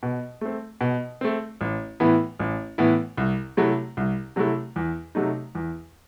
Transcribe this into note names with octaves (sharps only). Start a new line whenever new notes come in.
B2
A3 C4
B2
A3 C4
A1
A2 E3 B3 E4
A1
A2 E3 B3 E4
C2
C3 F#3 A3 E4
C2
C3 F#3 A3 E4
E2
C3 F#3 A3 D#4
E2